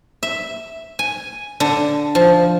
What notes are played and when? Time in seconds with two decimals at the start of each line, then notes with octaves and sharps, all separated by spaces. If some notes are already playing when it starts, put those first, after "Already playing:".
0.23 E5
0.99 G#5
1.60 D3
2.15 F3